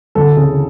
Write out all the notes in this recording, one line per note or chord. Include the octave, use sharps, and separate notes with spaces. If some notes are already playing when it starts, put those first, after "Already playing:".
D2 A4
C#3 E3 G#4